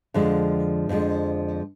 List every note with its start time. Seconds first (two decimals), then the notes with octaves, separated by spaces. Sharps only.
0.14 F2 D3 F3 G#3
0.89 F2 D3 F3 G#3